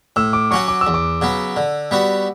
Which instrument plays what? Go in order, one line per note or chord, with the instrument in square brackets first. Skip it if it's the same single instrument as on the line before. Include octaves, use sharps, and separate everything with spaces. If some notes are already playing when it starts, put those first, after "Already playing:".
[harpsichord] A2 [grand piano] E6
[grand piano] D6
[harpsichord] F#3 C#4 F#4 [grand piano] C#6
[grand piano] D6
E6
[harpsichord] E2
[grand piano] D6
[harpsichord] C#3 F#3 B3
D3
G3 B3 F#4